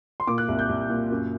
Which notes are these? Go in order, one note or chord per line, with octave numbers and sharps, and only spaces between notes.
C6
A#2 D6
F#6
C2
G6
C2
A#2
F#2